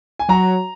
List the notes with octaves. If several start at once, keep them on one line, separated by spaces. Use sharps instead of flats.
G#5
F#3 A#5